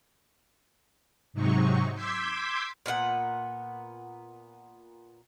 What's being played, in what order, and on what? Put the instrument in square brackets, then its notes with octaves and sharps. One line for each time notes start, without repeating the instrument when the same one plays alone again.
[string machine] G#2 C3 F#3 D#4 C#6
C6 D6 E6 G6 G#6 B6
[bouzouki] A#2 B3 D#4 F#5